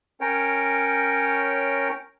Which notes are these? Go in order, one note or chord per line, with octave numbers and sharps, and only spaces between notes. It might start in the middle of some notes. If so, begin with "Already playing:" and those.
C#4 A#4 C#5 G5